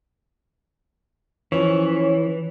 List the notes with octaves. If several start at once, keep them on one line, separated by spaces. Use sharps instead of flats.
E3 F3 C#4 C#5